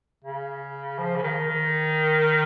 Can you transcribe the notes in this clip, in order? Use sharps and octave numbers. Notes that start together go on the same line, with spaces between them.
C#3
F3
C#3
D#3
D#3